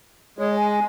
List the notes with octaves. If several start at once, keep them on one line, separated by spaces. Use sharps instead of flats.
G#3 C#5
G#5